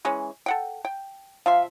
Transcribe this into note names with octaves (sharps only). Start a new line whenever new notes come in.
E3 G#3 C#4
A4 F#5 G5
G5
F3 E5 F5 C6